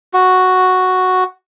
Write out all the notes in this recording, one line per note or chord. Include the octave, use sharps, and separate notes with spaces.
F#4